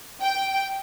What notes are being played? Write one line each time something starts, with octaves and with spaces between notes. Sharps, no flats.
G5